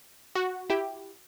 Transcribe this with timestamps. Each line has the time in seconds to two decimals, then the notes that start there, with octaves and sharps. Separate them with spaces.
0.35 F#4
0.70 E4 G4